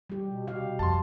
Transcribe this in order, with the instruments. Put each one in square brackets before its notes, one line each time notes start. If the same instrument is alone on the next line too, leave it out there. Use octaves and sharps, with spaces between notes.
[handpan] G3 G4
[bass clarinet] B2
[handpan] C3 G4 F5
[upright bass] F2 [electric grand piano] A5 C6